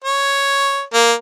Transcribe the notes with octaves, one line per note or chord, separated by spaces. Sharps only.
C#5
A#3